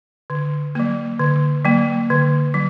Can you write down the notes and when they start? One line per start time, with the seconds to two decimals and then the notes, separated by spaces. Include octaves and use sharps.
0.30 D3
0.75 F#3 A#3
1.19 D3
1.65 F#3 A#3
2.10 D3
2.54 F#3